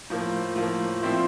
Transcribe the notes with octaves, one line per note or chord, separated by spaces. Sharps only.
A2 F3 A#3
A2 F3 A#3
A#2 F3 C4 E4